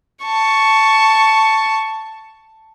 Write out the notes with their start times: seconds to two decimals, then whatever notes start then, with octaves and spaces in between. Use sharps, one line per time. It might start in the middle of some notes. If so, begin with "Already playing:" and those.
0.25 A5 C#6